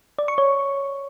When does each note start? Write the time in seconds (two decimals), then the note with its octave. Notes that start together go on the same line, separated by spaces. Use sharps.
0.19 D5
0.28 C#6
0.38 C#5